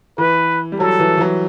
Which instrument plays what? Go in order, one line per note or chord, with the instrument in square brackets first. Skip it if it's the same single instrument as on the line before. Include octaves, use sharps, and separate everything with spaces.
[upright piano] E3 [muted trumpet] B4
[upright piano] G3
[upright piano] F#3 [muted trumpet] A4
[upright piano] E3
E3
F#3